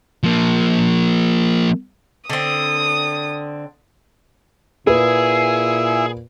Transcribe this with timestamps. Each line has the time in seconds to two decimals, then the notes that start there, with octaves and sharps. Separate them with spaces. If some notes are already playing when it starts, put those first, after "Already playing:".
0.24 F3 A#3
2.30 D3 C4 D#6
4.87 A#2 E4 G#4 B4